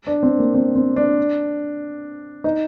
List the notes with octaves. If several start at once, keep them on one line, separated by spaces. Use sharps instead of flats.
D4
C4
A#3
C4
C4
D4
D#4